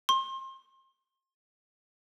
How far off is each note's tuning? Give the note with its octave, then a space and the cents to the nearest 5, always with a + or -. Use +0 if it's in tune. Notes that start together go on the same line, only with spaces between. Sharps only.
C6 +30